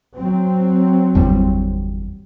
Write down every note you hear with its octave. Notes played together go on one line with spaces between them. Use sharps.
F#3 C4
G1 E2 G3